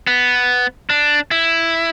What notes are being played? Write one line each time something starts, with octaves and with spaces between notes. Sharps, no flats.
B3
D4
E4